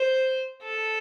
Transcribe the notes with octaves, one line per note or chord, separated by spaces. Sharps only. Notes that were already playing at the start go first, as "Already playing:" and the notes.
Already playing: C5
A4